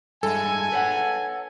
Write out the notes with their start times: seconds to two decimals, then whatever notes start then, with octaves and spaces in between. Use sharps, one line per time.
0.23 G2 G#3 E4 A4 G#5
0.72 B4 C#5 F#5